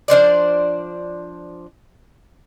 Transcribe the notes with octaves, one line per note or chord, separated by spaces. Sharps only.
F3 D4 C5 D5